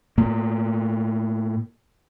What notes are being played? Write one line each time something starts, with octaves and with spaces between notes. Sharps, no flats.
A2 A#3